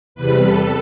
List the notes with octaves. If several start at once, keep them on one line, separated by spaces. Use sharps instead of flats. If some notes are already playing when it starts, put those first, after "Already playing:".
E2 C3 G3 B4
A4